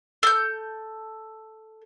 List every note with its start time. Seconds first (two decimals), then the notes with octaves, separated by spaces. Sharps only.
0.23 A4 G6